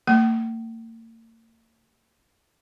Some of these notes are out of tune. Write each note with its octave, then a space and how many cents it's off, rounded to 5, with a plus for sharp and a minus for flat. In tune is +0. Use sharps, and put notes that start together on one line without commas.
G3 +0 A#3 -45 G5 -45